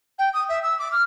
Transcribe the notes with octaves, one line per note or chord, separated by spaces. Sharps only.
G5
D#6
E5
E6
D6
F6